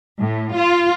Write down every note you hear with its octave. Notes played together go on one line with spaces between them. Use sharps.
A2
F4